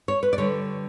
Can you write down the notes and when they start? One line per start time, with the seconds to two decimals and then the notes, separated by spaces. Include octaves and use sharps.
0.08 C#5
0.23 B4
0.33 D5
0.38 D3 G3 C#5